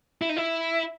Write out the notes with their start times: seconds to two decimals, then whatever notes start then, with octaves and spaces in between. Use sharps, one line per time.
0.22 E4
0.29 D#4
0.36 E4